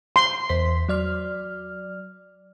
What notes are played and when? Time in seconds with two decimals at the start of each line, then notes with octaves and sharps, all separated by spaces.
0.16 C6
0.49 E2 C5 B6
0.89 F#3 D5 F6